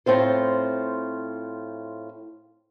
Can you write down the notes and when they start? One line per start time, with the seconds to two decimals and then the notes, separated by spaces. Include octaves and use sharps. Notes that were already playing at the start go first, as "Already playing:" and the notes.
0.06 A2 C4 F4 C5